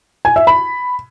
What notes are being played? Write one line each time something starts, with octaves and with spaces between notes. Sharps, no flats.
G#5
E5
B5